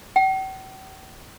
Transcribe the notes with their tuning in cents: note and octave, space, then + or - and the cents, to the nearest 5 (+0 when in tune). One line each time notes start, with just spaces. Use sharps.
G5 -45